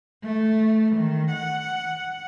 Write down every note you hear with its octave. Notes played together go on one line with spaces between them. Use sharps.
A3
D#3
F#5